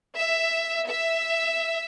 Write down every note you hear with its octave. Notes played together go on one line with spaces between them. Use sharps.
E5
E5